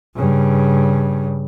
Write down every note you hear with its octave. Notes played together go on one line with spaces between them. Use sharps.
G2 C#3